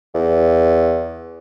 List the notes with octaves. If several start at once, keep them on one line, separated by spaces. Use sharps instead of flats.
E2